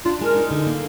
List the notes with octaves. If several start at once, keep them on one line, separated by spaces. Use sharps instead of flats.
D4 F4
G#3 A#4
D#4
D3
A#3